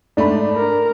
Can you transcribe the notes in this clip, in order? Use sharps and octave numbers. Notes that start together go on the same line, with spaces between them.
G#2 A3 D4 B5
A#4